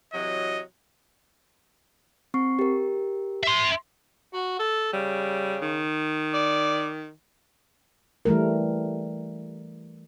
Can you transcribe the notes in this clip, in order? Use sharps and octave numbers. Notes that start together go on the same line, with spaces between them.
C3 E3 F#3 D#5
C4 C#6 C7
G4 A#4
E5 C6
F#4
A4
C#3 G3
D#3
D5
E3 G3 A3 A#4